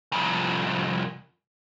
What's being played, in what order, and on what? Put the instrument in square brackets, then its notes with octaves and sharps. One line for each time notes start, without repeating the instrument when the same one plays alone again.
[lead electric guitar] C2 F2